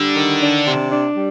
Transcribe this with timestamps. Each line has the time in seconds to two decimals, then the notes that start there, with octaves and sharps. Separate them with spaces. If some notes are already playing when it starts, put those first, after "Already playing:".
Already playing: D3 G3
0.16 D#3
0.41 D4
0.66 C3
0.91 D4
1.15 G3